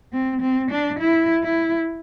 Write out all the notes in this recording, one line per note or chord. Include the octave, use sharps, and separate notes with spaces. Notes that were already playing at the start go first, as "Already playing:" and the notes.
C4
C4
D4
E4
E4